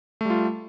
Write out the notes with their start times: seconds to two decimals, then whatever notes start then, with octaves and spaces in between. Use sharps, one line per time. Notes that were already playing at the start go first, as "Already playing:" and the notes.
0.21 A3
0.25 G3
0.30 F4